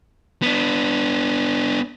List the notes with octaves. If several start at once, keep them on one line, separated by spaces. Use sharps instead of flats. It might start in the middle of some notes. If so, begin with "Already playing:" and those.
B3 D4